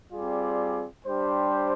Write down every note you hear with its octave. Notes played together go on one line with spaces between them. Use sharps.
G3 C4 F4 G#4 D5
G3 D4 G4 C5